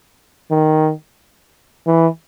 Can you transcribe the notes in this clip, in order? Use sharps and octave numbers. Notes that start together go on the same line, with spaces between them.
D#3
E3